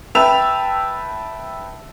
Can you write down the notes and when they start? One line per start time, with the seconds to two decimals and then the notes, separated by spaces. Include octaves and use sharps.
0.15 B4 E5 G5 A5 E6 F7